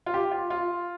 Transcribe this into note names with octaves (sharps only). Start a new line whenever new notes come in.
F4
G4
F4
F4